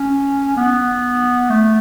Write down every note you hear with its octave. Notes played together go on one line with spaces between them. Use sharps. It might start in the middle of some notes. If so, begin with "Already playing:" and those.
Already playing: C#4
B3
A3